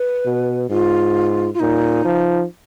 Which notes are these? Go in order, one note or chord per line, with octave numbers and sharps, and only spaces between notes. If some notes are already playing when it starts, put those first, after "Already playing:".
Already playing: B4
B2
G#2 F4
F4
A#2 D#4
F3